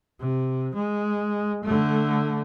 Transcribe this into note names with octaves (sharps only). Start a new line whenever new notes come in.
C3
G#3
D3 A3